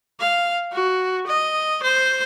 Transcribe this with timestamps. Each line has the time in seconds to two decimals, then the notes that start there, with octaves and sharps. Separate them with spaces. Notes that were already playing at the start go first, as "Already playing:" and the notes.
0.21 F5
0.73 F#4
1.27 D#5
1.83 C5